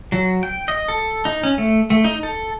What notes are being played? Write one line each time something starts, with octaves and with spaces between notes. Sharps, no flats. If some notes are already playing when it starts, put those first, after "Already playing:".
F#3
G5
D#5
A4
D#4
C#4
A3
A3
D#4
A4